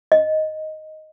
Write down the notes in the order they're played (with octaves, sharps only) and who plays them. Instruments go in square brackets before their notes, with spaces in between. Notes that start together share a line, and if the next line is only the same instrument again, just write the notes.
[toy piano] D#5